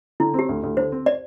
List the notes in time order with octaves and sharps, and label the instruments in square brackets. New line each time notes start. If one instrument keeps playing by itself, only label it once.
[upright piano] D3 [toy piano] E4
[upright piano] C4 [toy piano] G4
[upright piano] D2
D2
[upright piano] D3 [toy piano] C5
[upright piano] C4
[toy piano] D5